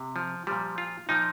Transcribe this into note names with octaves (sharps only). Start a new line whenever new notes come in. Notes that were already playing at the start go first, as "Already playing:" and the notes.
Already playing: C3
F3
A#2 F3 G3
F4
A#2 F3 D#4